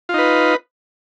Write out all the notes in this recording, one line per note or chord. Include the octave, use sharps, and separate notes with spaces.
D#4 F4 B4